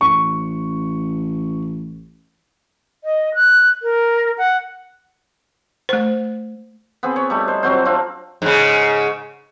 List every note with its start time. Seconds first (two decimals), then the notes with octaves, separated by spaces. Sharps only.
0.01 A1 C#6
3.04 D#5
3.35 F#6
3.83 A#4
4.38 F#5
5.89 A3 C5
7.03 B3 C4 G#4
7.16 C#5
7.30 G3 A3 D#4
7.48 C5
7.63 F#3 C4 F#4 C5
7.85 C4 D4 F4
8.42 G#2 C#3